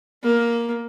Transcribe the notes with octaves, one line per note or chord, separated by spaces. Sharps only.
A#3